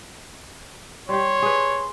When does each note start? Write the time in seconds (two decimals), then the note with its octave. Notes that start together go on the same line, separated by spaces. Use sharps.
1.09 G3 G4 C#5 C6
1.42 G#4 B4